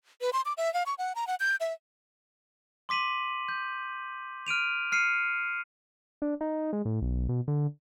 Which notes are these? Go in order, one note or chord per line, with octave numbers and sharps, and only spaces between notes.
B4
C6
D6
E5
F5
C#6
F#5
A#5
F#5
G6
E5
C6 D6 B6 D#7 F#7
G6
F6 D7 D#7 F7
F6 C7 C#7 D#7
D4
D#4
G#3
A2
B1
B2
D3